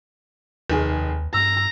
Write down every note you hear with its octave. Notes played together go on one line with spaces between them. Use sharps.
F1 D#2 D#3 G#4
G2 A#5 E6